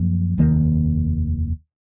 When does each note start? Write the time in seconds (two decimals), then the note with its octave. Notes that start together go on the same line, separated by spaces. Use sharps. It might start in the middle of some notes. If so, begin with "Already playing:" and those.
Already playing: F#2 F3 A#3
0.38 F1 D#2 D#3 A#3